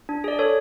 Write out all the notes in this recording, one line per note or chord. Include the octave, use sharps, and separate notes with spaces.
D4
G#4 D5
A4 C#5